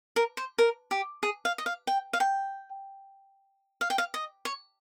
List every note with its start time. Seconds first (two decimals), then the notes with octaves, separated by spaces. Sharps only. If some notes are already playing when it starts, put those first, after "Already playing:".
0.16 A#4
0.37 C5
0.58 A#4
0.91 G4
1.23 G#4
1.45 F5
1.58 D#5
1.66 F5
1.87 G5
2.13 F5
2.20 G5
3.81 F5
3.90 G5
3.98 F5
4.14 D#5
4.45 C#5